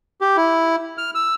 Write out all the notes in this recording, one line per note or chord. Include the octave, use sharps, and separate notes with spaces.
G4
E4
F6
E6